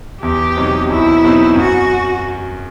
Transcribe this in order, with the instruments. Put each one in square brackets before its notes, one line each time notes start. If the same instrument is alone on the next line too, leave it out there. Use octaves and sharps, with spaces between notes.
[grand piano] E2 [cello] G4
[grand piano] B2 F#3 C4 D#4
[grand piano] E2 [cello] E4
[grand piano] B2 F#3 C4 D#4
[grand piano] F#2 [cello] F#4